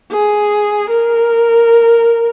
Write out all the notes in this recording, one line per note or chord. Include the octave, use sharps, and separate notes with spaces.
G#4
A#4